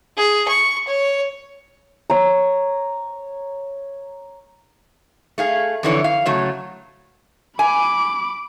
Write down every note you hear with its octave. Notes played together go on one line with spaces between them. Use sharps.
G#4
C#6
C#5
C#5 A#5
A3 G#4 F5
F2 D3 E3 C#5
F5
C#3 F#3 A3
G#5 B5 D6